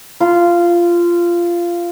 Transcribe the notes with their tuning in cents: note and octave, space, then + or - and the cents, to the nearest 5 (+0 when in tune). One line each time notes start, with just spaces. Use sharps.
F4 -15